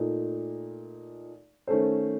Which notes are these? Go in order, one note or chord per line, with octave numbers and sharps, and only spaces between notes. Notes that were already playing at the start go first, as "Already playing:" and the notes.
Already playing: A#2 A3 D#4
D#3 A3 C#4 A4 C5